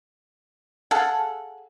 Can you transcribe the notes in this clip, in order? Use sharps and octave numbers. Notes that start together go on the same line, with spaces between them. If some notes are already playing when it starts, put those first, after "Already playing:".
G#4 A4 F5 F#5